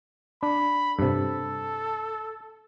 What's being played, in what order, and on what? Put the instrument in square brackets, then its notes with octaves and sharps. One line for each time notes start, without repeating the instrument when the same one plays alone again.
[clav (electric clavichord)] D4 [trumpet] B5
[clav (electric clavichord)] G2 C3 [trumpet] A4